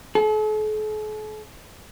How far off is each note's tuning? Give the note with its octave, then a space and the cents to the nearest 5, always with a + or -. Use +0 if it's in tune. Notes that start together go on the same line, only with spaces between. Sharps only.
A4 -45